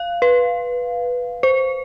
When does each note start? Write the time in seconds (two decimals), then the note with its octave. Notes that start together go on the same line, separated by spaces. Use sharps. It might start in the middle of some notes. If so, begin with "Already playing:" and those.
Already playing: F5
0.22 B4
1.43 C5